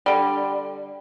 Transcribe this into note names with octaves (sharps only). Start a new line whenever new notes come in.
D3 G3